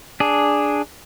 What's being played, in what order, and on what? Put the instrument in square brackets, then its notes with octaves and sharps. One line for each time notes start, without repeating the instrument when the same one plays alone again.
[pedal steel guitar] D4 G#4